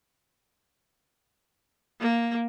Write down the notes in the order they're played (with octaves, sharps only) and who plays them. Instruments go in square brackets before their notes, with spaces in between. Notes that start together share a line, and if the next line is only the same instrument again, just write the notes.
[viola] A#3